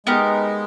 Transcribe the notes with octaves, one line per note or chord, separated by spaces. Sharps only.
G#3 B3 D#4 G4 A#4